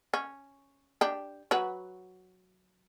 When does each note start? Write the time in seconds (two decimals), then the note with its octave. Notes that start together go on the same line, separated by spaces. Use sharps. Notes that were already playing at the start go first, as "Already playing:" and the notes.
0.14 C#4
1.01 D4 G4
1.51 F#3 F#4 B4